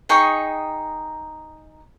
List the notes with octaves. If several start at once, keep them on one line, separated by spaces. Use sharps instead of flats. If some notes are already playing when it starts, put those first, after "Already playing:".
D#4 G#4 G5 C#6